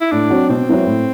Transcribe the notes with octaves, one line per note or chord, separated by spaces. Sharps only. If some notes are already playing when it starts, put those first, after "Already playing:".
E4
A2 D4
F#3 C4 F#4
B2 C4
F#3 B3 E4
A2